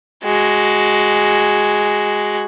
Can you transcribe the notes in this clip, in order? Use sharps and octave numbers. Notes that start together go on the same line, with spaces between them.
G#3 F#4